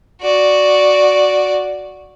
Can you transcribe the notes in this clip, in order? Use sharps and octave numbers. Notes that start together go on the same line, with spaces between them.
F#4 D5